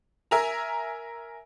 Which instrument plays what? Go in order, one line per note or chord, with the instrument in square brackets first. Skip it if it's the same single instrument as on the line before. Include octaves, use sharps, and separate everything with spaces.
[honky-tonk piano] A#4 E5 G#5 A#5